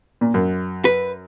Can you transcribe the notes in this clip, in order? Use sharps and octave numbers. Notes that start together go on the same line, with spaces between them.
A#2
F#2
B4